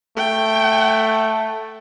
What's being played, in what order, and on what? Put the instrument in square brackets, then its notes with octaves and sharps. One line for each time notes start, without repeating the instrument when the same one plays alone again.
[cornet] A3 [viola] G5